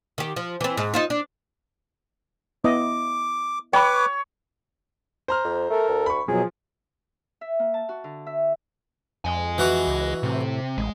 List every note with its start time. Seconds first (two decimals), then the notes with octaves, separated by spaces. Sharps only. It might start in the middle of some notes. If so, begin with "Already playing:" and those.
0.18 D#3 G4
0.36 F3
0.61 E3 C4
0.77 G#2
0.94 D#4 F4 C5
1.10 D4
2.64 B3 E4 D#5 D6
3.73 B4 C#5 G5 B5 D6
5.28 C5 A#5 F6
5.45 F2
5.70 A3 A4 A#4
5.89 D2
6.06 B5 C#6
6.28 B2 F3 F#3 G#4
7.41 E5
7.59 A#3
7.74 A5
7.89 F#4
8.04 D3
8.26 E5
9.25 F2 D#5 G#5
9.58 E3 F#4
9.87 C#2
10.23 A2 C3
10.78 A1 G#3